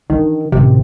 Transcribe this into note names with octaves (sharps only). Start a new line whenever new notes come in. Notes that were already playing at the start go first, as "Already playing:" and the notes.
D#3 E3 D4
A1 C3 D#3